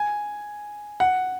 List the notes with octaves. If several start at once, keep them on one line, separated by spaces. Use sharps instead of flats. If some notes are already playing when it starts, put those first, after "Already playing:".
Already playing: G#5
F#5